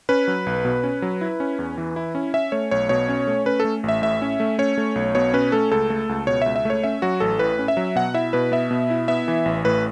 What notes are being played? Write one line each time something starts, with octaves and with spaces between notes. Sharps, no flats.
C#4 B4
F#3
B1
B2
C#4
F#3
E4
C#4
E2
E3
E4
C#4
C#4 E5
A3 C#5
B1 C#5
B2 C#5
C#4
A3
C#4 B4
A3 A4
A1
E5
A2 E5
C#4
A3
C#4 C#5
A3
B1
B2 C#5
C#4 B4
A3 A4
C#2 A4
A3
C#2
B2 C#5
C#2 E5
E5
A3 C#5
C#4 E5
F#3 F#4
A1 A4
A2 B4
C#4
E5
F#3
B2 F#5
E4 E5
B2 B4
B3 E5
B2
E4
B3 E5
E3
A1
A2 B4